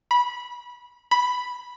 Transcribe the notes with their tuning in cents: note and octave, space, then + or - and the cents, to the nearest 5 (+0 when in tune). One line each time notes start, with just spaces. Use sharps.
B5 -20
B5 +0